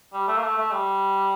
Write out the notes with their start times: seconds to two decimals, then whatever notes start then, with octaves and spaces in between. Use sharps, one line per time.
0.13 G3
0.28 A3
0.37 A#3
0.43 A3
0.58 A3
0.72 G3